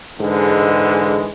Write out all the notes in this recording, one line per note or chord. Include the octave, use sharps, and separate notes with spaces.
G#2 D3 E3 G#3